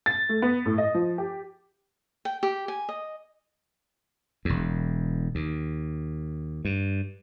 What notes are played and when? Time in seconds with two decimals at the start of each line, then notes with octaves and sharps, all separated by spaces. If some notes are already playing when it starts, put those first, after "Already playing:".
0.06 A6
0.29 A3
0.42 B3
0.65 A2
0.78 D#5
0.94 F3
1.18 G4
2.25 G5
2.43 G4
2.68 G#5
2.89 D#5
4.45 E1 E2
5.35 D#2
6.65 G2